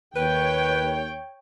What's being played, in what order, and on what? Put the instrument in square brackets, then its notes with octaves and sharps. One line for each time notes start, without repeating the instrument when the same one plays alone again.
[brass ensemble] D#2 [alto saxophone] B4 [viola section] C#5 G5